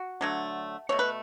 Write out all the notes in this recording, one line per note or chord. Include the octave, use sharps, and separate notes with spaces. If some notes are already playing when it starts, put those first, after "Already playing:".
Already playing: F#4
D3 F#3 A3
B2 A3 C#5
B4